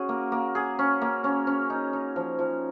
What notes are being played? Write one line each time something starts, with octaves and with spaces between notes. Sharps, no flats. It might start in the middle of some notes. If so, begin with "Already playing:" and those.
Already playing: C#4 F#4 G#4
A#3
A#3
G#4
C#4
A#3
C#4
C#4
D#4
D#4
F3
F3